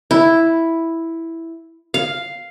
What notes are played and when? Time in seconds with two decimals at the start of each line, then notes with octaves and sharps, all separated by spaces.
0.11 E4
1.94 F5